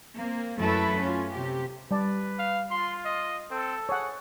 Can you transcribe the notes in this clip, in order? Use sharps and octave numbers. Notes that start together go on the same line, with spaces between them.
A#3 C4
F#2 F#3 A3 E4 A4 B4
C#4 F4
C3 G4
G3 B4 D5 A5
F5
F4 C6
D#5
C4 A4
G#4 C#5 F#5